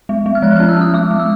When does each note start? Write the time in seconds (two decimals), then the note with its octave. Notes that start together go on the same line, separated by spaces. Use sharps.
0.09 G#3
0.26 G#3
0.35 F6
0.42 F3 F#6
0.56 F6
0.60 C#4
0.69 E6
0.77 C#4 D#6
0.94 G#3 D6
1.11 G#3
1.19 E6